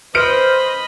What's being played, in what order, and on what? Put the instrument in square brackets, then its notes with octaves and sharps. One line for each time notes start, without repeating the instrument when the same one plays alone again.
[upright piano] B4 F6 D7 [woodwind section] C5 [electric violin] D#5 B5